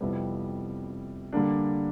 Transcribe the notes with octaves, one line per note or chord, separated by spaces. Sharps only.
F2 C3 E3 G3 B3
D3 G3 A#3 D4